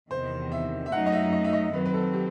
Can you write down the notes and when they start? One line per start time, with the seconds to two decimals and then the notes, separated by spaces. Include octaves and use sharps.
0.10 E2 C3 D#3 C5
0.52 E5
0.86 E5
0.92 F#2 F#3 A3 D#4 F#5
1.06 D#5
1.12 E5
1.33 D#5
1.44 E5
1.53 D#5
1.73 D#3 F#3 C4 B4
1.85 B4
1.94 A4
2.14 G4